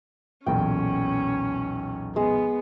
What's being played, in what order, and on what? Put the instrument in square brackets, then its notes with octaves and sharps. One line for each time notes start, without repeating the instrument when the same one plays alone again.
[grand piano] B1 E2 A#2 [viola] C#4 [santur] G5
[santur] G#3 [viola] B3